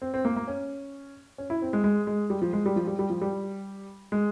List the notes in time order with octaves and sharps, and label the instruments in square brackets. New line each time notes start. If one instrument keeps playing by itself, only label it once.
[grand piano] C4
C4
A#3
A#3
C#4
C#4
E4
C4
G#3
G#3
G#3
G3
F3
G#3
G3
F3
G3
G3
F3
G3
G#3